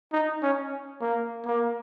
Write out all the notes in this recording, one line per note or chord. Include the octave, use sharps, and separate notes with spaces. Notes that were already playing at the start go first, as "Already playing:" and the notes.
D#4
C#4
A#3
A#3